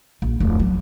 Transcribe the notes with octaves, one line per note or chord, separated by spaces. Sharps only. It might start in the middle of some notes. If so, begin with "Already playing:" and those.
A#1
D1 F2
F#3